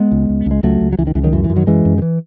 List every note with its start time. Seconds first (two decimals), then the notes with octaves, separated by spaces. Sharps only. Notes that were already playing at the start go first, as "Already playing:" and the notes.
Already playing: G#3 B3
0.11 C#2
0.29 C#2
0.46 C#2 G#3
0.63 C#2 F#3 A3
0.81 C#2
0.93 F#3
0.98 C#2 E3
1.07 D#3
1.15 C#2 E3
1.24 D#3 F#3
1.33 F#2 E3
1.44 E3
1.50 F#2
1.56 D#3 F#3
1.67 F#2 E3 G#3
1.85 F#2
1.98 D#3
2.02 E3